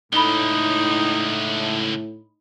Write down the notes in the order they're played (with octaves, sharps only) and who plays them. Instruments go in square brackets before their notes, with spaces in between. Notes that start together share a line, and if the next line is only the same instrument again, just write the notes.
[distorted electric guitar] C#2 D3 [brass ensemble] A2 [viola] D#4 [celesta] B5 G7